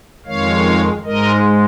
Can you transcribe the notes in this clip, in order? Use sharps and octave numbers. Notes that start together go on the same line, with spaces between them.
F2 D#3 G#3 C#5 F5
G#2 G#3 A#4 D#5